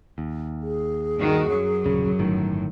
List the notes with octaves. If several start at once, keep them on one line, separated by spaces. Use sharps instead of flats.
D#2
G#4
G2 D#3 F#4
F#2 F#3
D#1 C2 C#3
G1 A2 D#3